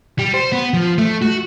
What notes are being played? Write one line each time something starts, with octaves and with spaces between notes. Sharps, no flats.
G3
C5
B3
F3
A3
F#4